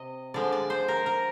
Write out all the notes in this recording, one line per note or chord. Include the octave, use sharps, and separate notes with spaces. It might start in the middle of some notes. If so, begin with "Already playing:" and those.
Already playing: C3 D#5
D3 F3 G#3 D5
D5
C5
A#4
A#4